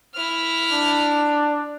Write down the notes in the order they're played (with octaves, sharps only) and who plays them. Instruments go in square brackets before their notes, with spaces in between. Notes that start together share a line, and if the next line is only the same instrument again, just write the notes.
[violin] E4 F6
[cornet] D4